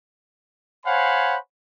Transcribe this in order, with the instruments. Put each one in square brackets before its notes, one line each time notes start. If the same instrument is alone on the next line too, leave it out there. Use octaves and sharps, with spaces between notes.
[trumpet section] C5 C#5 F5 F#5 G#5 B5